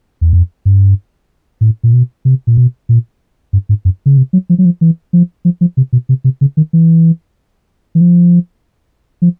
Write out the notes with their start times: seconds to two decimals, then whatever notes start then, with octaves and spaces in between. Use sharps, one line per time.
0.21 E2
0.33 F2
0.65 G2
1.61 A2
1.83 A#2
1.93 B2
2.25 C3
2.47 A#2
2.57 B2
2.89 A#2
3.53 G2
3.69 G#2
3.85 F#2
4.06 C#3
4.17 C3
4.33 F#3
4.50 F3
4.59 F#3
4.65 F3
4.81 E3
5.13 F3
5.45 F3
5.61 F3
5.77 C3
5.93 B2
6.09 C3
6.24 C3
6.41 C#3
6.57 D#3
6.73 E3
7.95 E3
8.01 F3
9.22 F3